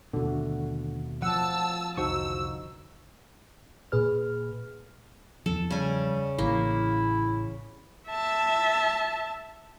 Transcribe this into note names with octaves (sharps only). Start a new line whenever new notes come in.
D#2 B2 D3 A3 F#4
F3 F#5 A5 E6
C2 F2 D3 D#4 F#4 C5 C#6 E6
A#2 G#4 B4 F6
E2 F3 A4
C#3 G3 G#5
A1 E3 A#3 E4
E5 A5